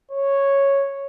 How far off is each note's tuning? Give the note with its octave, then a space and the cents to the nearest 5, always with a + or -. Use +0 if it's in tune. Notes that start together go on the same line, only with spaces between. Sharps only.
C#5 -5